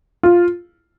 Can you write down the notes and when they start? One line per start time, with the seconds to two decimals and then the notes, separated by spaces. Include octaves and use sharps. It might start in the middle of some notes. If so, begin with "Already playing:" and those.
0.23 F4